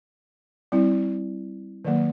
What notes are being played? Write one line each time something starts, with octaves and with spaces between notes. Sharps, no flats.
G3 C4 E4
D#3 F#3 A#3